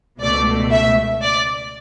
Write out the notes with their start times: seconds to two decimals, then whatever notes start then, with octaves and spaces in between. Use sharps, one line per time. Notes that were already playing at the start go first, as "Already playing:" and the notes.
0.21 C#2 B2 A3 D5
0.71 E5
1.22 D5